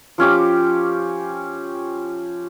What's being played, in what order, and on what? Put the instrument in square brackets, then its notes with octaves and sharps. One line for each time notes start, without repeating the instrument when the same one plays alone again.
[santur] F3 C#4 G4 D6